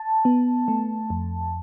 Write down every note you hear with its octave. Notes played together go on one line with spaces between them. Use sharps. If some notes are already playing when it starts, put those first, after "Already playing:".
Already playing: A5
B3
A3
F2